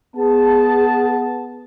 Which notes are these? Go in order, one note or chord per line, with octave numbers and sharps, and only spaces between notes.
B3 G#4 A5